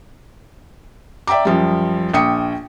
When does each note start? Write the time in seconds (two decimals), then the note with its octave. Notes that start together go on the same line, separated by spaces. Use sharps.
1.27 D5 E5 G5 A#5 D6
1.45 F#2 F3 G3
2.14 A#1 G5 D#6 C#7